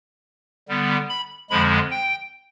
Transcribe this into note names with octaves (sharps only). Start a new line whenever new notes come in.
D3 G3 B3
B5
F2 D3 F3 G#3 B5
G5